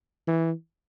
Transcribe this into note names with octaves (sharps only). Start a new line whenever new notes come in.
E3